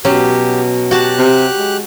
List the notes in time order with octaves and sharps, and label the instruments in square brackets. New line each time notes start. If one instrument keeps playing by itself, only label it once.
[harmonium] B2 [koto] F#3 C#4 [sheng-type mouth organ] G4
[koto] F#4 A5 [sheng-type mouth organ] G4 F#6
[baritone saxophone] C3
G#3